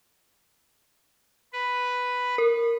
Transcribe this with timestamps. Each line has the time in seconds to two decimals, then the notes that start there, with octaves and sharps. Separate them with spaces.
1.53 B4
2.38 A#4